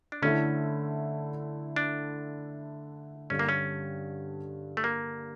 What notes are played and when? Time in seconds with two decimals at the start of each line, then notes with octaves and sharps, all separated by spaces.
0.12 D4
0.22 D3 A3 C#4 E4
1.76 D4
3.30 G2 D3 G3 C#4 D4
3.39 A#3
3.49 C#4
4.77 A3
4.84 A#3